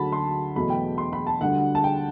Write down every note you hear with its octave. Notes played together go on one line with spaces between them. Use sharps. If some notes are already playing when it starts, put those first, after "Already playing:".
Already playing: D2 D3 F#3 A5 B5
C6
E2 B2 F#3 A3 B5
G5
C6
B5
A5
D2 D3 G3 F#5
A5
G5